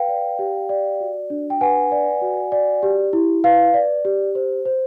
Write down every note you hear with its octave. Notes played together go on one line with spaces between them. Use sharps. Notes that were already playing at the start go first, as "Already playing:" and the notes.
Already playing: B4 F5 G5
D5
G4
D5
F#4
D4
G5
B4 F#5 G#5
D5
F#4
D5
G4
E4
B4 F5
D5
G4
C5
C5